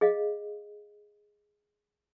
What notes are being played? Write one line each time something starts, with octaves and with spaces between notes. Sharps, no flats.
G#4 D#5 F5